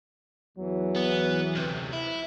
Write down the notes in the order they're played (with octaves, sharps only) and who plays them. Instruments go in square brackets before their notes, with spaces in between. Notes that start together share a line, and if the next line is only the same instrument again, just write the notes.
[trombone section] E2 F#3 [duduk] E3
[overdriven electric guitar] B3
D2 C3
E4